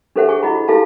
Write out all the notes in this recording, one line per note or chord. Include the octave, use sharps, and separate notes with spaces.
D4 G4 A4 C5 E5 F#5
G#4 G#5 C#6
E4 F#4 D#5 F#5 B5
E4 G4 A4 F5 G#5 A5